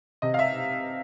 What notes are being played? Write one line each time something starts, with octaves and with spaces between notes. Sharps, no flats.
C3 D#5
F5
E5